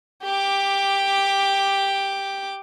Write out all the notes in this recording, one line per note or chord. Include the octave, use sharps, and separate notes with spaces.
G4 D6